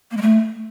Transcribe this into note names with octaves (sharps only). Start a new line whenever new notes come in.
A#3
G#3
A3